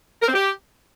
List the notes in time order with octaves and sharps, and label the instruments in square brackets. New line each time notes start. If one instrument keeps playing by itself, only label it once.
[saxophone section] A#4
C4
G4